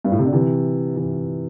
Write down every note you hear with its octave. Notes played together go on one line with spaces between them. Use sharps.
G2
A2
C3
D3
C3 E3
C3 E3